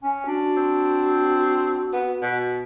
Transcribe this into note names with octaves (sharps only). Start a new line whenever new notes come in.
C#4 G#5
D4 F#4
C4
B3
B2